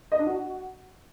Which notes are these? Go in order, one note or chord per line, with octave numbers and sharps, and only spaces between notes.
D#5
D4
F#4